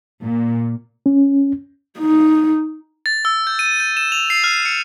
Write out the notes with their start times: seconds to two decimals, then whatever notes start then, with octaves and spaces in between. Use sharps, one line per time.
0.24 A#2
1.06 C#4
1.99 D#4
3.06 A6
3.25 E6
3.47 G6
3.59 D#7
3.80 G6
3.97 E7
4.12 F7
4.30 C7
4.44 F6
4.65 C#7